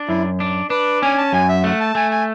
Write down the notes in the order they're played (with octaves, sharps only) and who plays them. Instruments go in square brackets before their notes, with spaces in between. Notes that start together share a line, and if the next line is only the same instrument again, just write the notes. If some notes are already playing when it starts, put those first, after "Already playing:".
Already playing: [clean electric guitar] D4
[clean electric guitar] F#2 [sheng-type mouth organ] E4
[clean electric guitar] D4
[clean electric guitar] D4 [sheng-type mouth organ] B4
[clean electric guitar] C#4 [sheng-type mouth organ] G#5
[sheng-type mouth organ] A5
[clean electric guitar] F#2 [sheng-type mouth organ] G#5
[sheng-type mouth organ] E5
[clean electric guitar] A3 [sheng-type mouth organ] F#5
[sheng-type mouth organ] A5
[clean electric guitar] A3 [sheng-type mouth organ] G#5
[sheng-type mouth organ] G#5